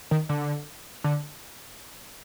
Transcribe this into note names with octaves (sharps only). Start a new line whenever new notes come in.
D#3
D3
D3